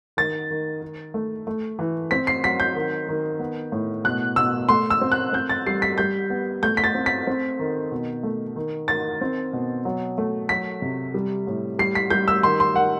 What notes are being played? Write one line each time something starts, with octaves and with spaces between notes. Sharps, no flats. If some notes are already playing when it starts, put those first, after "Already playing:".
D#3 A6
D#3
D#3
A3
A3
E3
C4 B6
C7
F#3 B6
G6
D#3
D#3
B3
A2
B2 F#6
B2 E6
A3 C6
E6
C4
F#6
C4 G6
A6
G3 C7
B6
G3 G6
B3
A3 G6
B6
A6
C4
B6
C4
D#3
B2
A3
D#3
D#3 A6
C4
B2
F#3
A3
F#3 B6
C3
G3
A2
G3 C7
B6
G3 G6
E6
D#3 C6
C6
D#3 F#5